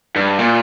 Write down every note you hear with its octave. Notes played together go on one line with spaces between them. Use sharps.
G2
A#2